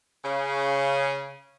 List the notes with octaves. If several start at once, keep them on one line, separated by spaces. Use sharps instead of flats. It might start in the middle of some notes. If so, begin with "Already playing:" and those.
C#3